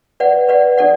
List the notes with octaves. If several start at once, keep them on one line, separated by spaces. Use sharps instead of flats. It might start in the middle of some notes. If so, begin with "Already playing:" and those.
B4 D5 F#5
B4 D5 F#5
D4 A4 D5 F#5